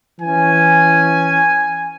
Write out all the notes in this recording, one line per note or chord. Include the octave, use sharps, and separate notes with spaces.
E3 C#4 G#5